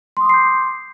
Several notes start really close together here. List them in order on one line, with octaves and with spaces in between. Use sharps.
C6 D#6 D6 C7 G6